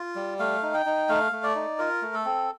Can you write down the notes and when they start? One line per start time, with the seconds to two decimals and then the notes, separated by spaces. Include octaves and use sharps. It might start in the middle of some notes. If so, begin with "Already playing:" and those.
Already playing: F4
0.16 G3
0.39 A3 F5
0.62 D#4
0.74 G5
0.86 D#4
1.09 A3 F5
1.32 A3
1.43 D5
1.55 D#4
1.79 F4 A#4
2.02 A3
2.14 A4
2.25 C4